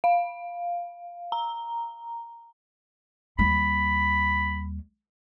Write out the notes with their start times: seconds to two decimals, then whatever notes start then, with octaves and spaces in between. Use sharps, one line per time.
0.04 F5
1.32 A#5
3.39 D#2 G3 B5